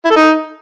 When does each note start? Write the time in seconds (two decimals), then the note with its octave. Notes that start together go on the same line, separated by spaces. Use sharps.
0.05 E4
0.11 A4
0.16 D#4